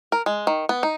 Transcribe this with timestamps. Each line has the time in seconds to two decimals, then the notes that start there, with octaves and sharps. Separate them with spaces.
0.12 A#4
0.26 G#3
0.47 D#3
0.69 B3
0.83 D#4